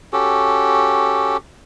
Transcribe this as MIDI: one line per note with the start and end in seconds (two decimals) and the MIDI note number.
0.13 1.37 61
0.13 1.37 66
0.13 1.37 67
0.13 1.37 69